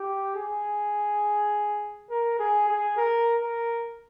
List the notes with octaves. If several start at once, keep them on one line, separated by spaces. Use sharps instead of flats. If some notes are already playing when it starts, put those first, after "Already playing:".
Already playing: G4
G#4
A#4
G#4
G#4
A#4
A#4